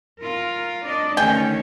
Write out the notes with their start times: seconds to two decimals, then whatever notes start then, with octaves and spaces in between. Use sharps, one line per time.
0.21 F4 A#4
0.86 D4 D5 D#5
1.17 D2 D#3 C#4 G#4 G5